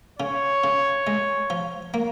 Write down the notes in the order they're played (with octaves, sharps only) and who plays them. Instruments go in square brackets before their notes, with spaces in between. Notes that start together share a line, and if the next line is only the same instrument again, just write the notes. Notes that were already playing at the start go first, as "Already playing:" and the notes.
[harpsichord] C#3 [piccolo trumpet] C#5
[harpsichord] C#3
G#3
F3
A#3